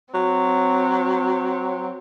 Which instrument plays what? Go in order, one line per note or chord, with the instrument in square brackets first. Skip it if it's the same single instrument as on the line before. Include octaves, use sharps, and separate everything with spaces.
[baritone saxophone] F#3 [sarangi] C4